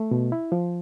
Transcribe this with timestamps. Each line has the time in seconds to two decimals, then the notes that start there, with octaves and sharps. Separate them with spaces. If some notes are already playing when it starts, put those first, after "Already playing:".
Already playing: A3
0.11 B2
0.32 E4
0.52 F3